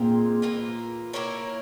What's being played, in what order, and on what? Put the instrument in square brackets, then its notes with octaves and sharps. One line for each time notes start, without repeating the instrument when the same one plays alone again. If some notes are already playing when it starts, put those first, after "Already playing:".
Already playing: [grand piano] A#2 [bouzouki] G#3 C4 F4 A#4
[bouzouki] E3 A#3 F4
A#3 E4 A#4 C#5